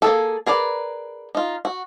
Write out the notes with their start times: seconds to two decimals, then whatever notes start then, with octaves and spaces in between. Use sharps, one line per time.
0.02 A#3 G#4 A4
0.46 G#4 A#4 B4 D5
1.35 D#4 F4
1.65 F#4